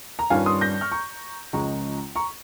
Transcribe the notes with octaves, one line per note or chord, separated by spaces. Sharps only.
A#5
G2 D#3 G3 C#4 F4 F5 G#5
C6 D#6
G6 A#6
C#6 F6
A#5 C#6
C#2 C#3 F3 G#3 C#4 A#5 C#6
A#5 C#6